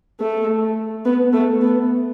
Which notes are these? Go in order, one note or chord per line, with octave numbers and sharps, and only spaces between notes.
A3
B3
A3
B3